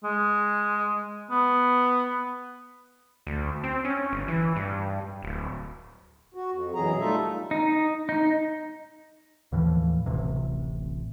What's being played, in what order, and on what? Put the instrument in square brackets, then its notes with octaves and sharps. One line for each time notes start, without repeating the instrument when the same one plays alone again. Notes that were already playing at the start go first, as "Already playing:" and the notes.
[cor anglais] G#3
B3
[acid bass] D2
C4
C#4
G1
E3
G2
D1
[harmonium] F#4
F2
F#2 B2 E3 F#3 G#4 A#5
G3 A3 D#4 F4 A4 E5
[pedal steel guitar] D#4
D#4
[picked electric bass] D#2 A2 E3 F3
D1 A1 C3